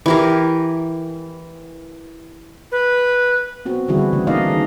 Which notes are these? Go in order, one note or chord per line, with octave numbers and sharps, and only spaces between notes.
E3 G4 A#4
B4
B3 C4 F#4
D3 E3 G3 E4 F#4 G#4
C#3 E3 A3 D4
A#3 D4 D#4 D5 D#5 F5
D#3 G#4